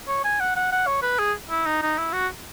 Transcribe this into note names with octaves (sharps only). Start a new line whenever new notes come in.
C#5
G#5
F#5
F#5
F#5
C#5
B4
G#4
E4
D#4
D#4
E4
F#4